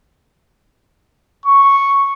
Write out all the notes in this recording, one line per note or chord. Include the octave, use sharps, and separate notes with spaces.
C#6